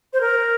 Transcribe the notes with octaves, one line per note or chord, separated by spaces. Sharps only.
C5
A#4